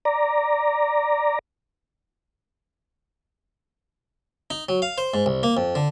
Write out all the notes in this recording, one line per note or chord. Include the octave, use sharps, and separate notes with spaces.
D5 A#5
D#4
F#3
F5
C5
G#2
C2
A#3
F2
D3